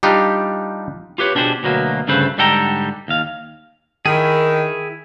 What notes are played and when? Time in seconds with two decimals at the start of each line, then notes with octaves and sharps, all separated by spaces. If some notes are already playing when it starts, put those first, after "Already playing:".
0.03 G3 D4 D#4 F4 G4
1.18 F4 G4 B4 C#5
1.35 B2 D4 G4 G#4 C5
1.63 D2 B2 F#3 A#3
2.08 D2 G2 C#3 A3 B4 C5
2.38 G#2 D3 G3 A4 G5 A#5
3.08 D#2 F5
4.06 D#3 E4 G#4